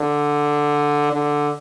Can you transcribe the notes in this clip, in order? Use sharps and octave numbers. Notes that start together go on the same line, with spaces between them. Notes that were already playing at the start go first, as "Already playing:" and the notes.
Already playing: D3
D3